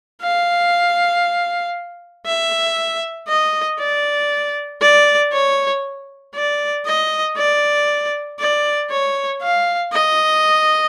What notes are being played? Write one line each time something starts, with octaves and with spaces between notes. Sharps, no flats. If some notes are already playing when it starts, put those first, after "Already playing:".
F5
E5
D#5
D5
D5
C#5
D5
D#5
D5
D5
C#5
F5
D#5